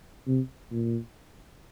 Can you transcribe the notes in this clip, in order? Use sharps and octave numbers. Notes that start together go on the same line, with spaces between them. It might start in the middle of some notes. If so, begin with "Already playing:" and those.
C3
A#2